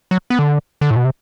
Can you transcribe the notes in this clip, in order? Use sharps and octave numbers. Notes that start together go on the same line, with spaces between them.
F#3
B3
D3
D3
A2
B2
C3